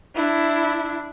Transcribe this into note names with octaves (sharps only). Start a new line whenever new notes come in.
D4 E4